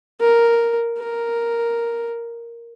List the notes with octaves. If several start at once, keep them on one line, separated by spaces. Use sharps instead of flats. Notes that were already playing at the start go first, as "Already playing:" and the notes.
A#4
A#4